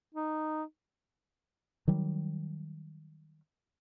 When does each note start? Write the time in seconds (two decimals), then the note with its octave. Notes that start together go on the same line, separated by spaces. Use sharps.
0.15 D#4
1.88 D#3 F#3 G3